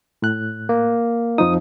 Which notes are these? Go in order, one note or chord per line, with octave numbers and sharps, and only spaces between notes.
A2 F#6
A#3
F2 F3 D#4 D#6